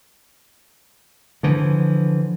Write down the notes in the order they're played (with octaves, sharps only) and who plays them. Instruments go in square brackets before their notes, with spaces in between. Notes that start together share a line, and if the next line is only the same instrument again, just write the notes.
[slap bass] D3 E3 F3